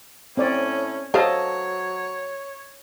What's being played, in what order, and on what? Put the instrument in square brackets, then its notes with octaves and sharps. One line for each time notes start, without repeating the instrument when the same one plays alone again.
[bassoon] A2 [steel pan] C4 D5 [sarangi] C#4
[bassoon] F#3 [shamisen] G4 C5 F5 [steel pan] A4 D#5 A5 [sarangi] C#5